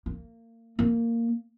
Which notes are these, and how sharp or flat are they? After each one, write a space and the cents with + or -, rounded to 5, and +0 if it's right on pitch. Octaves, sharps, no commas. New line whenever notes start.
A#3 -30
A#3 -10